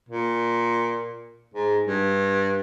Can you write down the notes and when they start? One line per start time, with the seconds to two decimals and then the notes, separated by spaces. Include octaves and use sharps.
0.09 A#2
1.54 G#2
1.87 G2